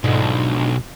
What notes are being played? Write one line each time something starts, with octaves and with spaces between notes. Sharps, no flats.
B1 G#2 D3 F3